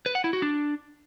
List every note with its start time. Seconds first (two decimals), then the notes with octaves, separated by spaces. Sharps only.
0.06 B4
0.15 F#5
0.24 E4
0.33 F#4
0.42 D4